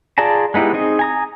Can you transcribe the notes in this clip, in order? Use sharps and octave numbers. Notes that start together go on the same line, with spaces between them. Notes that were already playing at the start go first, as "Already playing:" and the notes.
F4 G#4 D5 A5 A#5
G#3 B3 D#4 E4 G4
C4 D#4 G#4 D#5
G#5 A#5 D#6